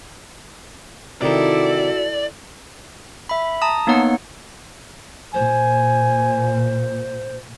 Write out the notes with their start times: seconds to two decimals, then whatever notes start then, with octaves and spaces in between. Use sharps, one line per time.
1.22 C3 D#3 D#4 E4 F#4 A4 D5
3.29 E5 B5
3.62 A5 A#5 D#6
3.87 A#3 B3 D#4 C#5 F#5
5.34 A#2 C5 G#5